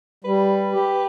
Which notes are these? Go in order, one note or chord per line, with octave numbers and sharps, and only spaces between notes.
G3 B4
G4